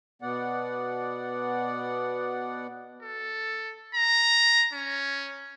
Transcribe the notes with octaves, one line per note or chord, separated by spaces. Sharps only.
B2 B3 D5 F#5
A4
A#5
C#4